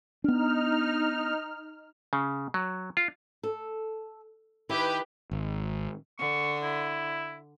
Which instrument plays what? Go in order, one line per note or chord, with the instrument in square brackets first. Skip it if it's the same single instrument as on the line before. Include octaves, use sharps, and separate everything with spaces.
[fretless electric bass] B3 D4 [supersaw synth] D#4 F6
[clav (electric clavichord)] C#3
F#3
F4
[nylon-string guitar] A4
[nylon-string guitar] D#3 E4 [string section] G4 B4
[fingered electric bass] G#1
[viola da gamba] D3 [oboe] C#6
[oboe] E4